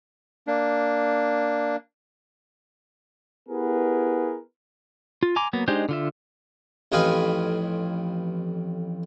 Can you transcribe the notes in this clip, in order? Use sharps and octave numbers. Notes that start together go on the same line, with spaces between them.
A#3 D4
B3 E4 G4 G#4 A#4 B4
F4
G#5 A#5 C6 D6
F#3 A#3 B3
G#3 D4 D#4 G4 C5
D3 F4 E5
A1 F2 D#4 F4 B4 G#5